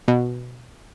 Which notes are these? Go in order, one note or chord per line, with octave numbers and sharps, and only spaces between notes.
B2